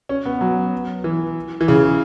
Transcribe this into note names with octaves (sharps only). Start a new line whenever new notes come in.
C#4
B3
F#3
E3
E3
C#3